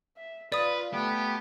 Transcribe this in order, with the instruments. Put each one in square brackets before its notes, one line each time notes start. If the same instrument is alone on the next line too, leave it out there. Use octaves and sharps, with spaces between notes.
[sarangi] E5
[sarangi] F4 [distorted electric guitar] B4 [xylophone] D5 D#6
[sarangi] A3 [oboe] B3 [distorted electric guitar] G4